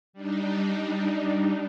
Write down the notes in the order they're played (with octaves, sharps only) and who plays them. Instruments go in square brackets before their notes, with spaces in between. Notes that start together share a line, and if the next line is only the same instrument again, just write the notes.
[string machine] G3 D4 D#4